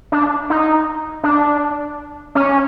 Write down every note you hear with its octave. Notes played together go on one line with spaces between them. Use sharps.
D4
D#4
D4
C#4